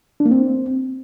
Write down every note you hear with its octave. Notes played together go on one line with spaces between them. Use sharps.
D4
A#3
C4